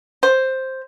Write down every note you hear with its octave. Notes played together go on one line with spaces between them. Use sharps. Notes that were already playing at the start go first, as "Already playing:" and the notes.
C5